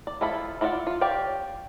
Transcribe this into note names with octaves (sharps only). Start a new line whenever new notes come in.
D5
F3 E4 F4 A4 B5
E4 F4 C#5 D5 F#5
F4
G4 C#5 D5 F5 G5